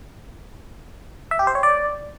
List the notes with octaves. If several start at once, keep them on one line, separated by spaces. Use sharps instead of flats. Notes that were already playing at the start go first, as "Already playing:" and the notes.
E5
G4
C5
C#5
D5